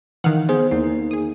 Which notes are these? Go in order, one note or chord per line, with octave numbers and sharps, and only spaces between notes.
D#3 E3 F5 F#5
B3 G#4 C5
E2 A#3 D#4
G#4 D#6